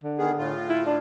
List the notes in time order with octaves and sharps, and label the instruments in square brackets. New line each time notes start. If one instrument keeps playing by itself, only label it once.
[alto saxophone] D3
[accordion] D#3 B3 G#4
A2 F4
[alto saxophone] E4
D4